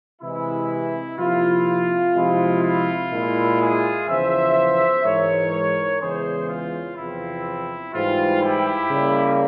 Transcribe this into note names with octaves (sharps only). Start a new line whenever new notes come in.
C3 E3 G#3 E4
C3 F3 A#3 E4 F4
C3 F3 G#3 E4
F4
A#2 G#3 E4
F4 G#4
E2 C#3 F3 C5 E5
G#2 E3 G#3 A#4 C#5
E2 C#3 E3 G#3 C#4 G#4 C5
F4
E2 C3 F3 C4 E4
G#2 E3 G3 F4
E4 G4
C#3 G3 A#3